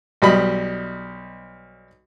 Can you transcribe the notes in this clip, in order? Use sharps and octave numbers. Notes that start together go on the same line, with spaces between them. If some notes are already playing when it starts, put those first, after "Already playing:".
B1 G3 D#5 B5